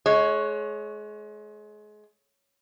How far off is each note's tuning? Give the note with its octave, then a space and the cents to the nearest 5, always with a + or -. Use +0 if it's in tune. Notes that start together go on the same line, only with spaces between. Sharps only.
G#3 +30 C#5 +0